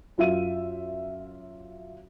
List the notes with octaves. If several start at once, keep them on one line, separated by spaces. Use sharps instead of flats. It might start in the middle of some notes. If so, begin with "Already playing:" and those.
F#2 F4 E5 D#7